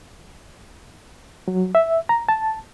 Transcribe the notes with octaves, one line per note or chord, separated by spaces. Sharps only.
F#3
E5
A#5
A5